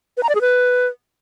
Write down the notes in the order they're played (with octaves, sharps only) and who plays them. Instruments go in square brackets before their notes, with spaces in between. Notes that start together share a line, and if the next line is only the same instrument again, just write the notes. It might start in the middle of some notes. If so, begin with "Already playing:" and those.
[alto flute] B4
A#5
D5
G#4
B4